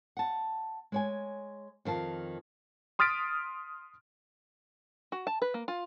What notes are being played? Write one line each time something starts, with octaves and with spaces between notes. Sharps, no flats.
F#5 A5
G#3 C#5 G#5
F2 D#3 F5 A5
C6 D#6 F6 A6 B6 D7
F#4
A5
B4
A#3
F4